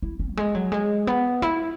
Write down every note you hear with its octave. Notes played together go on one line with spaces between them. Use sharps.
E4
C#4
F#3
G#3
F#3
G#3
B3
E4